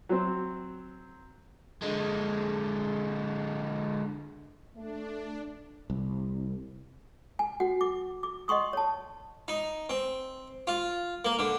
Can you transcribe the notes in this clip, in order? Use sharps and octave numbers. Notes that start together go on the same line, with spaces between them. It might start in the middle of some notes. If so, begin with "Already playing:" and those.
F#3 C4
D3 G#3
A3 D4
C2
G#5
F#4 F#5
D6
D6
D#5 F#5 C6 C#6 D#6
C#5 A5
D#4
C4
F4
A#3
D3